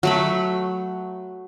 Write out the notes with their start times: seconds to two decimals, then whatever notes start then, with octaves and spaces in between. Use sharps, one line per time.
0.03 F#3 A3 B5